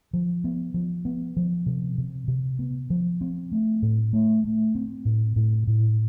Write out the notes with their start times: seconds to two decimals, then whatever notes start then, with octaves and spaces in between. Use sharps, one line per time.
0.13 F3
0.44 B3
0.74 F3
1.05 B3
1.37 F3
1.66 C3
1.98 C3
2.28 C3
2.59 B3
2.90 F3
3.21 C4
3.52 A3
3.82 A2
4.13 A3
4.44 A3
4.75 C4
5.05 A2
5.36 A2
5.67 A2